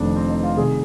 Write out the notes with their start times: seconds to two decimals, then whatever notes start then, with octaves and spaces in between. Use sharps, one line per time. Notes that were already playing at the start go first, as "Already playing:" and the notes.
Already playing: F1 F2 D#3 D4
0.16 C4
0.30 D#4
0.43 F4
0.56 C2 C3 D#3 G#4